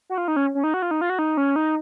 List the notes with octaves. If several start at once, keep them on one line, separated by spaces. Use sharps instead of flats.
F#4
F4
D#4
C#4
C#4
D#4
F#4
F4
D#4
F4
F#4
D#4
C#4
D#4